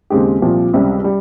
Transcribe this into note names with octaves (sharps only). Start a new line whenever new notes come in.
D#2 C#3 G#3 C4 G4
C2 A#2 F3 C4
C#2 C3 G3
G3